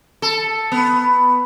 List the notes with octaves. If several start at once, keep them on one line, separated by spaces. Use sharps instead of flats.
A4
B3